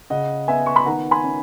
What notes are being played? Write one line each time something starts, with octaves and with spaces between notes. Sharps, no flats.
C#3 D#5 F#5
B3 E5 G#5
C#6
B5
D#3 F#5 A#5
G#5 B5
C#4